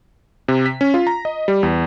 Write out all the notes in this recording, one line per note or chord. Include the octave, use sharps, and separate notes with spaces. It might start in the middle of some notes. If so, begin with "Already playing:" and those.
C3
B6
C#4
F4
A#5
D#5
G3
E2